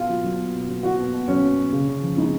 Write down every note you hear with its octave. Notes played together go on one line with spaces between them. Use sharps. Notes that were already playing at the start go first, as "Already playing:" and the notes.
Already playing: B2 F4
F#3
F#3
B2
B2
F#3
F#3 F#4
B2
B2
F#3 C#4
F#3
B2
C#3
C#3
F3
G#3 D#4